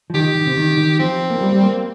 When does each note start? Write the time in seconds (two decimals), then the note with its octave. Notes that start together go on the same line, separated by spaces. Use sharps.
0.10 F3
0.14 D#3 G4
0.35 D#3
0.46 C3
0.57 D#3
0.77 D#3
0.99 F3 C4
1.30 A#3
1.41 G3
1.52 G3
1.63 A#3